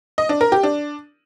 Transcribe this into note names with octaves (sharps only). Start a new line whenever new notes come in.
D#5
D4
A#4
G4
D4